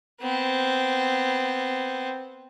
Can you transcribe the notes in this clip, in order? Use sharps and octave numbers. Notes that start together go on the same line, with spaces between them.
B3 C4